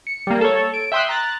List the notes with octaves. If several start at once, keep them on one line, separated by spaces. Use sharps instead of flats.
C#7
G3 A#3
A4 C#5
D7
E5 G5 C6 D#6 F#6
A#5 F#6 A6